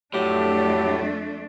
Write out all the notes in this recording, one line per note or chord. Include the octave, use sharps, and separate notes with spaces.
F2 A2 F#3 A3 D4 G4